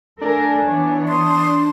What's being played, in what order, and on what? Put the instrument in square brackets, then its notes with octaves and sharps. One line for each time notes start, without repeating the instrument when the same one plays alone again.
[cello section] A3 A4 A#4 [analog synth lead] D4 [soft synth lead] G#5
[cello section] E3 B3 C#5
[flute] C6 [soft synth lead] D#6